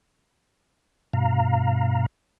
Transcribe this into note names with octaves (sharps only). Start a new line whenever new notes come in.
G2 B2 F5 A#5